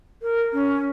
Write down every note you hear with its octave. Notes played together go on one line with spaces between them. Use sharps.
A#4
C#4